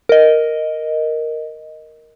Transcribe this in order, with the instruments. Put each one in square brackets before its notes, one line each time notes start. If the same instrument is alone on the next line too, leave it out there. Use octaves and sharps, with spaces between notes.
[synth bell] A#4 D#5